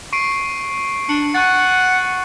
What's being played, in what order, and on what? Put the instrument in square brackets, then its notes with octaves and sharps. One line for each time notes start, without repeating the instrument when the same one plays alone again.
[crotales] C#6 C7 D7
[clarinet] D4 [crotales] C#7 F#7
[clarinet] F#5 [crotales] C#6 F#6 A6